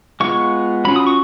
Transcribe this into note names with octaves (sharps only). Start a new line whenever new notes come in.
G#3 B3 F4 C#6
F#3 C#4 F4 B5
D#6
C#6